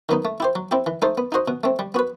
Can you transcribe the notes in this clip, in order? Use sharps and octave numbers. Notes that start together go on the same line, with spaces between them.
D#3 F#3 B3 D#4
A3
E4 G4 C5
F#3
C4 E4 G4
E3
A3 D#4 A4 C5
B3
D#4 F#4 C5 D#5
B2
A3 C4
G3
B3 F#4 B4